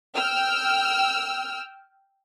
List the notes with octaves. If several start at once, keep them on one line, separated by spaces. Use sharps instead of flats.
G5 E6 F6